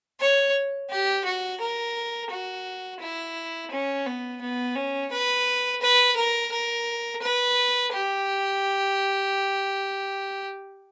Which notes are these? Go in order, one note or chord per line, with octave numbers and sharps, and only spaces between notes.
C#5
G4
F#4
A#4
F#4
E4
C#4
B3
B3
C#4
B4
B4
A#4
A#4
B4
G4